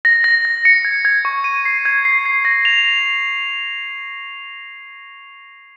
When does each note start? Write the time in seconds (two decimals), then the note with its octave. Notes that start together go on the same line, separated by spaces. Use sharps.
0.05 A#6
0.24 A#6
0.45 A#6
0.65 C#7
0.85 G#6
1.05 G#6
1.25 C#6
1.44 D#7
1.65 C7
1.85 G#6
2.05 C7
2.25 C7
2.45 A#6
2.65 F7
2.85 F7